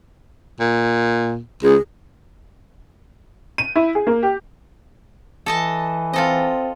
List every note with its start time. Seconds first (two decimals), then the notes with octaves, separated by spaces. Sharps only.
0.60 A#2
1.63 C#2 G#4
3.58 D#7
3.76 E4
3.95 G#4
4.07 A#3
4.23 G4
5.46 E3 A4 D#5 A5
6.13 C4 F4 A4 D#5